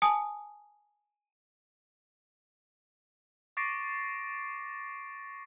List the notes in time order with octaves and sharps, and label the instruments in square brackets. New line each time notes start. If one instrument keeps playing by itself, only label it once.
[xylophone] G#5 A5 D#6
[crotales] C#6 D6 A6 A#6 C7 D7